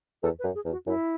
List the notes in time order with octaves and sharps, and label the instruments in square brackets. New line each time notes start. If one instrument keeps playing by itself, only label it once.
[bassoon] E2 [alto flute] A4
[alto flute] B4
[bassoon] F#2
[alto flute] G#4
[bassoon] E2
[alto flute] F#4
[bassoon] F#2 [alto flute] E4